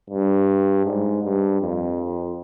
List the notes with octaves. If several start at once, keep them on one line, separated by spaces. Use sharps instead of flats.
G2
G#2
G2
F2